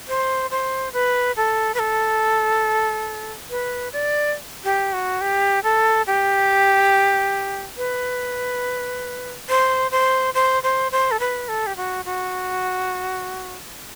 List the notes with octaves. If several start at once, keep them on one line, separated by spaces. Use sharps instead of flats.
C5
C5
B4
A4
B4
A4
B4
D5
G4
F#4
G4
A4
G4
B4
C5
C5
C5
C5
C5
A4
B4
A4
G4
F#4
F#4